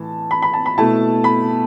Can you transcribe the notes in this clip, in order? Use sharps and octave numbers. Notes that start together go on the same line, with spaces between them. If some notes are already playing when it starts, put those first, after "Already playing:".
Already playing: A2 E3 A5
B5
B5
A5
B5
B2 A3 E4 A5
B5